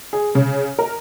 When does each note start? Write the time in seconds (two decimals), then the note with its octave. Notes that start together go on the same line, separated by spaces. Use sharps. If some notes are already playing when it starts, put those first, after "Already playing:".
0.13 G#4
0.35 C#3
0.79 A#4